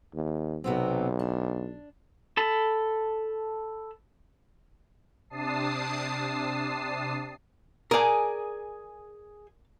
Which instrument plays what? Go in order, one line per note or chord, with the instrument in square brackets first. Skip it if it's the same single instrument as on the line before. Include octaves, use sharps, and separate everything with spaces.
[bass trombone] D#2
[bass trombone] B1 [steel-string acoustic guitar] C3 B3 C4
[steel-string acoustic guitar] D4
[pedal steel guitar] A4 A5 B5
[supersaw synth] C3 D4 A5 D#6 C7
[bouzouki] G#4 G#5 [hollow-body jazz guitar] A#4 D5